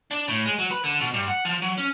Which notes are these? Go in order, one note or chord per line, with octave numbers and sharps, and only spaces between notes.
D4
A2
G#3
F#3
B4
D3
B2
G2
F#5
F3
F#3
C#4